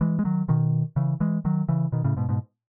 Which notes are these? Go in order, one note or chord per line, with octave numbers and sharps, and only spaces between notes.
E3 G#3
G#3
D#3 F#3
B2 D#3
C#3 E3
E3 G#3
D#3 F#3
C#3 E3
B2 D#3
A2 C#3
G#2 B2
G#2 B2